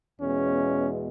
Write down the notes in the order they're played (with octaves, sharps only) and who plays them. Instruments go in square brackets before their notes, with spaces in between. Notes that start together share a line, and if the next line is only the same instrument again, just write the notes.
[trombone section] E2 B2 G#3 C#4